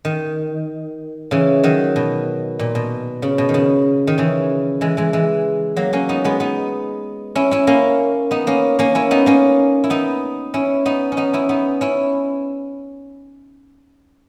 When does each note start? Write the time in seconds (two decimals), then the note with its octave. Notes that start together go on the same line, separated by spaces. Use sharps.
0.05 D#3
1.31 C#3 E3
1.64 D#3 F#3
1.96 B2
2.59 A#2
2.75 B2
3.22 C#3
3.38 B2
3.49 D#3
3.54 C#3
4.07 D#3
4.18 C#3 E3
4.81 E3 G#3
4.97 E3 G#3
5.13 E3 G#3
5.76 F#3 A#3
5.93 A#3 C#4
6.09 B3 D#4
6.24 G#3 B3
6.40 B3 D#4
7.35 C#4 E4
7.51 C#4 E4
7.67 A#3 C#4
8.31 B3 D#4
8.47 A#3 C#4
8.79 A#3 C#4
8.95 C#4 E4
9.11 B3 D#4
9.26 A#3 C#4
9.84 E4
9.90 B3 D#4
10.54 C#4 E4
10.85 B3 D#4
11.12 C#4
11.17 B3 D#4
11.33 C#4 E4
11.49 B3 D#4
11.81 C#4 E4